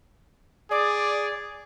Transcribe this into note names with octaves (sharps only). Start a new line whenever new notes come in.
G#4 D5